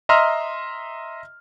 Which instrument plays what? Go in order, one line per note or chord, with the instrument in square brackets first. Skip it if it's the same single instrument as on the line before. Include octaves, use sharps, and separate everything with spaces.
[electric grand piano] D#5 E5 A#5 C6 E6 F6